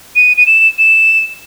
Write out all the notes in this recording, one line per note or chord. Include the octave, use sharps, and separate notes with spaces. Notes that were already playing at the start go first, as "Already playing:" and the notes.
D#7
D#7
E7
E7